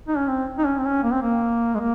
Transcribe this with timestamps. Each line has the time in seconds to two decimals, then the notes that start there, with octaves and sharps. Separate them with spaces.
0.08 D#4
0.18 C#4
0.27 C4
0.58 D#4
0.66 C#4
0.78 C4
0.85 C#4
1.03 A#3
1.13 C4
1.22 A#3
1.75 G#3
1.80 A#3